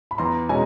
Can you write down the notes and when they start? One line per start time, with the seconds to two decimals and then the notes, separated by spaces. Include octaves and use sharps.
0.11 B5
0.18 E2 A#5 C6
0.49 B2 G#3 C#4 G#5 A#5